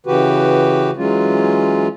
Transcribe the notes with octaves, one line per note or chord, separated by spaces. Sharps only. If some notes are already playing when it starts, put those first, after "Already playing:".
C#3 E3 F#4 G4 B4
E3 F#3 G#3 C#4 F4